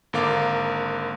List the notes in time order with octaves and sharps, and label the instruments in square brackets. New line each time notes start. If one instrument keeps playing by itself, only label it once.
[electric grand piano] G#1 D3 A#3 F5 D6